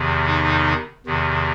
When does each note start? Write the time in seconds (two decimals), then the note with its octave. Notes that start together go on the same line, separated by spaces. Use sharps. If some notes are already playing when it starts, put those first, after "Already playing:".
Already playing: E2 C3 D#3
0.26 D#4
1.06 E2 C3 D#3